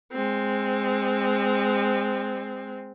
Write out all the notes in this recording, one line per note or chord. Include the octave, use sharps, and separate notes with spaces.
G#3 C4